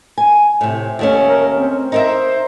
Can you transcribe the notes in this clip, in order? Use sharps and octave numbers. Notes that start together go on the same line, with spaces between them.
G#5
A2 C3
D#2 A3 C#4
A#4
C4
D#4 A#4 C5 E5